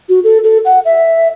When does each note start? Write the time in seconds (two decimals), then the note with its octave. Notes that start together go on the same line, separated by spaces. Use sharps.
0.09 F#4
0.24 A4
0.43 A4
0.65 F#5
0.85 E5